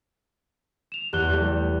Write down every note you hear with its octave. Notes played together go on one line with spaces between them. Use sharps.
E7 F7
E2 G4 F#6 G7
G3 A3